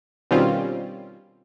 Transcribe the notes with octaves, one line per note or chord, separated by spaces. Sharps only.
B2 D#3 G3 C4 C#4 F4